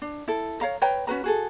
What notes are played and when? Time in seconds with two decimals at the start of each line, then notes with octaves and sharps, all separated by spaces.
0.02 D4
0.28 E4 A4
0.61 C#5 F5 A#5
0.81 B4 C#5 G5 A#5
1.07 C#4 F#4 B4 A#5
1.24 F#4 G#4 A4